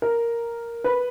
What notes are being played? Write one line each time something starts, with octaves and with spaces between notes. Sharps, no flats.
A#4
B4